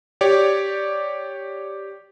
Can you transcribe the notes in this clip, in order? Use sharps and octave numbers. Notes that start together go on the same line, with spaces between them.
G4 C#5 D5